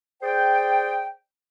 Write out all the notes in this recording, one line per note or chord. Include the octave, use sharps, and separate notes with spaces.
G#4 C5 D5 G5